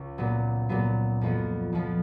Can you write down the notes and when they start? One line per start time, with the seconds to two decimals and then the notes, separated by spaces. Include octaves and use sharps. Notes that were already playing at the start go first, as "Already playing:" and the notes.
Already playing: C#2
0.18 A#2 F#3 B3
0.69 A#2 F#3 B3
1.21 F2 F3 B3
1.73 F2 F3 B3